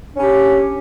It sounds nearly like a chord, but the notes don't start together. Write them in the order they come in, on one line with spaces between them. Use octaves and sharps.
D4 C#4 G4